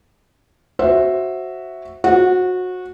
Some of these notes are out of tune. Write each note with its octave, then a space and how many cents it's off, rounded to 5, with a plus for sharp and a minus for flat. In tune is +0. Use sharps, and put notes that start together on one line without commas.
F#4 +0 C5 +15 E5 +0
F#4 -20 C5 +30